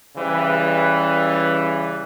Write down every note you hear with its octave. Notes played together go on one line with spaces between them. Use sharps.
C#3 E3 G3 B4